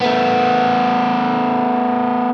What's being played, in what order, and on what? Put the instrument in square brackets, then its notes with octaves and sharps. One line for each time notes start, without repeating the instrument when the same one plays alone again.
[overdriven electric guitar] A3 B3